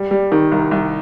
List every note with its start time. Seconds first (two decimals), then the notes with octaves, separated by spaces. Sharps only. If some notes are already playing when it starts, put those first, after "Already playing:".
Already playing: G3
0.11 G3
0.32 D#3
0.52 C2
0.71 C2